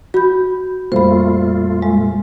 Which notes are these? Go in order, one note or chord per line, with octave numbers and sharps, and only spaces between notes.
F#4 B5 G6
F2 A#2 G3 A3 A#3 F4 C5 B5
G#3